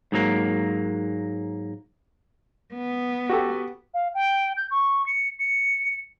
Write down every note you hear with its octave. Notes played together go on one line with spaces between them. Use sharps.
G#2 F#3 A#3
B3
F#4 G4 A4
F5
G5
G6
C#6
C#7
C#7